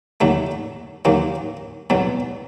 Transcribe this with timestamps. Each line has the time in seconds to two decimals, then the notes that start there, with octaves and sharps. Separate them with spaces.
0.21 D#2 D#3 F#3 A3
1.05 D#2 D#3 F#3 A#3
1.90 C2 B2 F#3